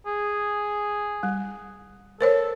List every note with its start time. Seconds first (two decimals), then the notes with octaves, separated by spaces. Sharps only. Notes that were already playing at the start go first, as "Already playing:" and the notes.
0.06 G#4
1.23 G3
2.21 A4 A#4 C5 C#5